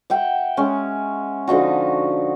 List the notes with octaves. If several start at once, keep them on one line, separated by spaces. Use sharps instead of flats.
E5 F#5 G5
G#3 C#4
D3 F3 D#4 F#4